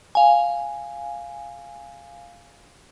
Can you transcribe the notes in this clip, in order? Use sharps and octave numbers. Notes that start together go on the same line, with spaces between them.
F5 G#5